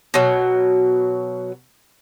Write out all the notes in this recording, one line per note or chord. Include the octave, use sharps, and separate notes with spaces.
B2 F#3